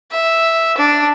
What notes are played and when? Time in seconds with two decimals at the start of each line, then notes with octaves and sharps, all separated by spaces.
0.11 E5
0.78 D4